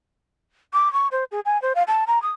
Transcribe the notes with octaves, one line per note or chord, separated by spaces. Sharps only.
D6
C#6
C5
G#4
G#5
C5
F5
A5
A#5
D#6